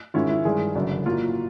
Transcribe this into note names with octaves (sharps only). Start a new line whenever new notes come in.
G#2 D#3 G#3 C#4 E4 F4
E4
G2 D#3 G#3 G#4
F#1 F#2 D3
A2 F#3 A#3 F4